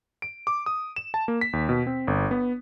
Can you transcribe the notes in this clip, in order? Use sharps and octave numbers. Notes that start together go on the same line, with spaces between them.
D7
D6
D#6
E7
A5
A#3
B6
D#2
B2
C4
G1
B3